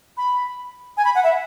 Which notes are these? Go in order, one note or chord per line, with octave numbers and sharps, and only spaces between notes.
B5
G#5
B5
F#5
E5